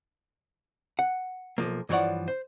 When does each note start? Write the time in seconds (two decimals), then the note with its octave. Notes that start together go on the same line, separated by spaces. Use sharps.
0.99 F#5
1.58 B1 F#2 F3 A#3
1.89 G2 E3 F3 C#5 D5 F#5
2.28 C5